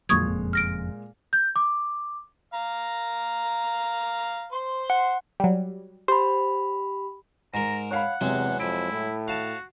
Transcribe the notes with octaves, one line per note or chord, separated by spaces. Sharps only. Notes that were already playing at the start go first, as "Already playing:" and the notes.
F2 A#2 D3 F#3 G#3 C#6 D#6 G#6
F#1 F2
F6 A#6 D7
G6
D6
F5 A#5
C5 C6
F#5
F#3 G3
G4 C5 B5
G#2 A#4 A#5
C#5 F5 F#5 B5
E2 C3 F#3 G#3
F2 E4 D7
A2
F#4 F5 A5